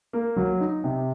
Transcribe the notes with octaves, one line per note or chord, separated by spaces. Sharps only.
A#3
F#3
D#4
C3